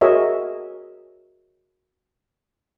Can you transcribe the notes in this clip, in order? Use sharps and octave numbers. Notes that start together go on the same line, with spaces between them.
F#4 G#4 A#4 C#5 D#5 E5